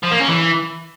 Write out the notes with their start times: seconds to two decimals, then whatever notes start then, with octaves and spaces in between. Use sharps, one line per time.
0.03 F3
0.11 A#3
0.20 C#4
0.28 E3